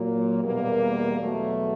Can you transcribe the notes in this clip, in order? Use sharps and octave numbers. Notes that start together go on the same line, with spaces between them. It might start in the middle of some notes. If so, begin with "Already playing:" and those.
Already playing: A#2 F#3 A#3
E2 B2 G3 A#3
E2 B2 F#3 A3